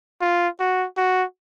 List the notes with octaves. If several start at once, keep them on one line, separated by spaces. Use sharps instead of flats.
F4
F#4
F#4